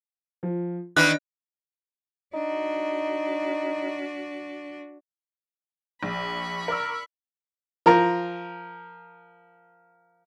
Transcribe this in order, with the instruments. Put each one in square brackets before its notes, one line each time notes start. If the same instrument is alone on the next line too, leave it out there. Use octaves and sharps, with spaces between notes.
[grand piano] F3
[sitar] D#3 E3 B3 [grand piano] D4 [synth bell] F#6
[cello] D4 F#4 [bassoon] D#4
[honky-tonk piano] A#1 [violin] B5 C#6
[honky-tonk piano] A#4 D5 E6
[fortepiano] F3 A#4 A#5